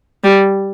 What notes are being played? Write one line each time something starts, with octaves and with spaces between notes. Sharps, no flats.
G3